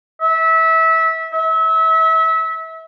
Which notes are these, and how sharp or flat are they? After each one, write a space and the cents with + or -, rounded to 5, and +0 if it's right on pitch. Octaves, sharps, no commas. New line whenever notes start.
E5 -25
E5 -30